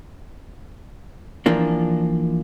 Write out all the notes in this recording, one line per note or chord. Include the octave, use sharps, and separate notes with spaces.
E3 F3 A#3 D4